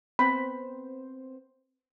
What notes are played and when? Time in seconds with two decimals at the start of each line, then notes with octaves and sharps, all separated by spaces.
0.19 B3 C4 C5 B5